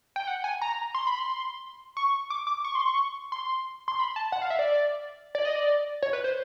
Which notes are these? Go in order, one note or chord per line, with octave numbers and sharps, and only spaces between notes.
G5
F#5
G#5
A#5
C6
B5
C6
C#6
D6
D6
C#6
C6
C#6
C6
C6
B5
A5
F#5
F5
E5
D5
D5
D#5
D5
C#5
B4
C5